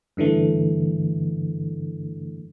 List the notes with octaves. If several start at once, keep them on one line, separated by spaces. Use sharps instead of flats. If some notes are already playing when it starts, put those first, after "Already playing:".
G2 D3 E3 A3